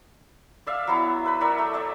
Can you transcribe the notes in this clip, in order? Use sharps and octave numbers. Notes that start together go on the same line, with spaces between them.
D5 E5 F5
F#3 B3 E4
B4 B5
F#3 A#4 D5 E5
A3
C#5 D5 E5